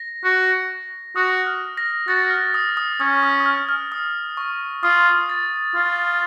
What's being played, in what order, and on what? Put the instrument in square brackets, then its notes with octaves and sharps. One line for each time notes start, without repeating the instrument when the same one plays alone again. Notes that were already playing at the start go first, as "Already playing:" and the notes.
Already playing: [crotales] A#6
[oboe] F#4
[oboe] F#4 [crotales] D#6
[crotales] F6
A#6
[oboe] F#4 [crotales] A6
[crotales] F6
D#6
D#6
[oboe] C#4 [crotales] D#6
[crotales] D#6
D#6
F6
F6
D#6
C#6
[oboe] F4 [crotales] D#6
[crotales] A6
[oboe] F4